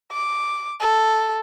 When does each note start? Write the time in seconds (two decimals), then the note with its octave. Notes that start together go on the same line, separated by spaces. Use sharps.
0.13 D6
0.81 A4